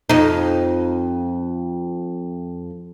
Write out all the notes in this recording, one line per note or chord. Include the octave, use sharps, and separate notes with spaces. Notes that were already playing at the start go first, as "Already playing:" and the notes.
F2 D#4